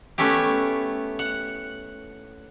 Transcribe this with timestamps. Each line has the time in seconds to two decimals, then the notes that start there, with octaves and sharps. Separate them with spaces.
0.18 A3 B3 C#4 E4 G4
1.19 F#5